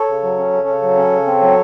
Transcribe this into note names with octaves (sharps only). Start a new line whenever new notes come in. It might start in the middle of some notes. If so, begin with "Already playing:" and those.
Already playing: A4 C#5
C#3
F#3
C#4
C#3
C#3
F#3
C#4
C#3
C4
F#3